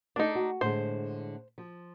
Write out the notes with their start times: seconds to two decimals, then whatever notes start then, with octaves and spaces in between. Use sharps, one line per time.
0.16 A3 D4 D#4 G#4 A4
0.35 F#4
0.61 A2 D3 G#3 C5
1.58 F3